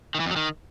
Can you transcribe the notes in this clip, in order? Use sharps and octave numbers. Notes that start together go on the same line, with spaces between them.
D#3
E3
F2
F#3
D#3